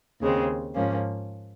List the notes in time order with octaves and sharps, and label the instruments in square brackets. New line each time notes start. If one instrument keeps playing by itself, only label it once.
[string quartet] D#2 C#3 G#3 C4
G#2 F3 A#3 C#4